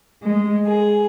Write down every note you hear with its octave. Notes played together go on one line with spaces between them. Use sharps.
G#3
G#4